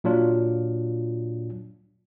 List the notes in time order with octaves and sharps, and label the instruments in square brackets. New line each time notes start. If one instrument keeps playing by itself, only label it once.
[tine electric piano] A#2 F#3 D4 F4